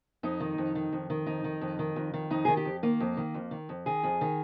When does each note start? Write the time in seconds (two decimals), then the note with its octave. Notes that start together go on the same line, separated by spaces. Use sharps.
0.23 F2 D#4
0.40 D#3
0.58 F2
0.75 D#3
0.92 F2
1.10 D#3
1.26 F2 D#4
1.44 D#3
1.61 F2
1.79 D#3
1.96 F2
2.14 D#3
2.30 F2 D#4
2.45 D#3 G#4
2.57 G4
2.65 F2
2.83 D#3 A#3
3.00 F2
3.17 D#3
3.34 F2
3.51 D#3
3.69 F2
3.86 D#3 G#4
4.03 F2
4.21 D#3